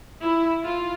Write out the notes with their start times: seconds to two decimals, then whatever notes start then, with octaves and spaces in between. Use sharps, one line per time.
0.22 E4
0.64 F4